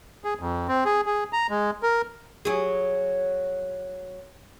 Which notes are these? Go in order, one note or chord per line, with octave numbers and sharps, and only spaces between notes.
G#4
F2
C4
G#4
G#4
A#5
G#3
A#4
F#3 G#4